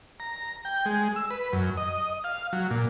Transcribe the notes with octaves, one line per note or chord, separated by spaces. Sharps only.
A#5
G5
G#3
E6
B4
F#2
D#5
F5
F#3
A#2